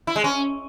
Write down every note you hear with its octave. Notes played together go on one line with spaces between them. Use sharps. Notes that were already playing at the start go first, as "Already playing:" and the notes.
E4
G#3
C#4